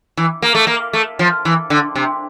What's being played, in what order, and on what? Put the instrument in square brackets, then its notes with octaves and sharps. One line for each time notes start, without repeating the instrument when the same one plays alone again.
[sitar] E3
A#3
A3
A#3
A3
F3
E3
D3
C3